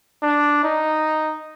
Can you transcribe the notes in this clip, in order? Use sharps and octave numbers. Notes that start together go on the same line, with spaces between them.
D4
D#4